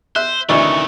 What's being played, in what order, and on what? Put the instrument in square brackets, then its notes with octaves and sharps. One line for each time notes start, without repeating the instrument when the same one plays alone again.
[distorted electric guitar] C5 [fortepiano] E5 F#6
[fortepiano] D2 D5 [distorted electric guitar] C3 A3 [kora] D#3 E3 C#4 [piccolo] C#6